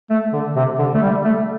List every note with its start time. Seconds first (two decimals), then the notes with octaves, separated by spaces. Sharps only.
0.10 A3
0.33 D3
0.56 C3
0.79 D3
0.94 A3
1.02 G3
1.25 A3